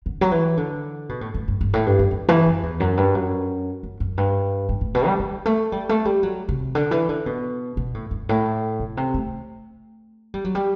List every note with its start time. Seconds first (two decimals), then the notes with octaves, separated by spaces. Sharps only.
0.06 D3
0.21 F#3
0.31 E3
0.57 D3
1.09 B2
1.21 A2
1.34 A2
1.48 G2
1.61 G2
1.73 A2
1.86 G2
1.99 F#2
2.11 G2
2.29 E3
2.46 F#2
2.63 E2
2.80 F#2
2.97 G2
3.15 F#2
3.83 F#2
4.00 F#2
4.18 G2
4.69 G2
4.81 A2
4.95 B2
5.07 G3
5.20 G3
5.45 A3
5.72 G3
5.89 A3
6.05 G3
6.23 F#3
6.49 C3
6.75 D3
6.91 E3
7.09 D3
7.26 B2
7.77 B2
7.94 A2
8.11 G2
8.29 A2
8.80 B2
8.97 C3
9.14 A3
10.34 G3
10.45 F#3
10.55 G3